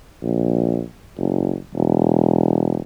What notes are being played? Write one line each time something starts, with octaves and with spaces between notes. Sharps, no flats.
A#1
F#1
E1